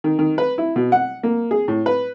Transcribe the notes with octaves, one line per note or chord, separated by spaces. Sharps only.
D#3
D#3
B4
E4
B2
F#5
A#3
G#4
A2
B4